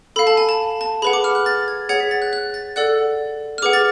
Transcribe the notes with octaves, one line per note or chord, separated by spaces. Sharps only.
A4 F5 B5
A5
G#5
A5
A5
G#4 B4 F#5 B5
D6
F6
F#6
A6
G#6
G#4 C#5 F#5 G#6
B6
A6
F#6
F#6
A6
A4 D5 F#5 F#6
F6
G#4 B4 F#5 D6
A6